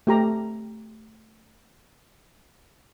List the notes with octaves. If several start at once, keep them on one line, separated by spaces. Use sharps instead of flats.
A3 G4 A#5